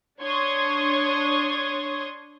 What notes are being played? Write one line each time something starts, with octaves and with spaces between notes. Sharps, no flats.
D4 C#5 C6 C#6 D#6 G#6